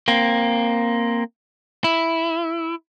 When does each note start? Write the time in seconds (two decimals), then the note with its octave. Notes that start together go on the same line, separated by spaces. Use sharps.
0.08 A#3 C4
1.84 E4